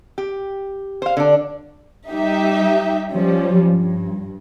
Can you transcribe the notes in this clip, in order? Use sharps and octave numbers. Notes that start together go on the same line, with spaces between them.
G4
C5 F5
D3 D4
G3 D#4 G4 E5
F3 G3 C#4
G2